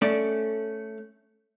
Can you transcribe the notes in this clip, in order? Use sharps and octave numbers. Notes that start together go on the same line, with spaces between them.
A3 C#4 D5